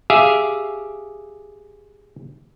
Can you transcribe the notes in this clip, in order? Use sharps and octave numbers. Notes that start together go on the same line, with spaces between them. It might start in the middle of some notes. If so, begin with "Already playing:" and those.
G4 G#4 E5 F5